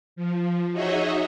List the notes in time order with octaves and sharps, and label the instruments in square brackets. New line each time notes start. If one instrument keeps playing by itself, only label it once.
[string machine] F3
D#4 F#4 G#4 C#5 D#5 E5